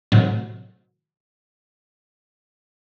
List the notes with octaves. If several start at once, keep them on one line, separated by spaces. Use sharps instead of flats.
A2 C3 D#3 F#3